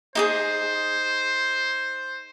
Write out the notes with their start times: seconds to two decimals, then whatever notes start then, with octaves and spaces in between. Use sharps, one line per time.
0.15 D#4 G4 G#4 C5